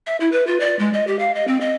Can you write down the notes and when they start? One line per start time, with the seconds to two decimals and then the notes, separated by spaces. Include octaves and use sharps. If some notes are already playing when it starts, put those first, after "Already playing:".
0.07 E5
0.20 E4
0.32 B4
0.47 F4
0.60 D5
0.79 G#3
0.93 D#5
1.07 G4
1.19 F5
1.35 D#5
1.47 C4
1.61 D#5